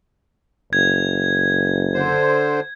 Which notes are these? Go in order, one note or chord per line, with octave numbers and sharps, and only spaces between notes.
F#1 G#6
D3 C5